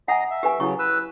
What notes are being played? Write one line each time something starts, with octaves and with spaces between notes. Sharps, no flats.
D#5 F#5 G#5 A#5
E5
G4 B4 G#5
C#3 F#3 E4 C#6
B4 E6